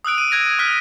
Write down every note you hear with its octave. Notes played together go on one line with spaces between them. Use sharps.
D#6 E6 F#6 D7
D#7
F#6 G#6 A#6 D#7
G#6
D#6 F6 F#6 B6 D#7